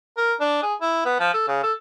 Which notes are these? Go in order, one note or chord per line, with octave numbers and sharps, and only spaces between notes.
A#4
D4
G#4
E4
B3
F3
A4
C#3
A4